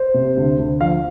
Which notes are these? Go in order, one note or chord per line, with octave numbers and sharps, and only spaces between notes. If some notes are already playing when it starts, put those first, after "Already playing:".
Already playing: C5
C3
D2
D2
F3 F5